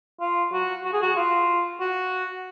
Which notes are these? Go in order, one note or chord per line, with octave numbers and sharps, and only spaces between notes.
F4
F#4
F#4
G#4
F#4
F4
F#4